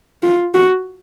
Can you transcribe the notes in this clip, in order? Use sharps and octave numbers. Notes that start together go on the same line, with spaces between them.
F4
F#4